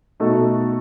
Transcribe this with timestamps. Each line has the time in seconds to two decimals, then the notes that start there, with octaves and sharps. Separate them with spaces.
0.20 B2 A3 D#4 F#4 A4